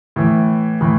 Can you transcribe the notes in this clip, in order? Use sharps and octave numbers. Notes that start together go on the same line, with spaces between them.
A2 E3
A2 E3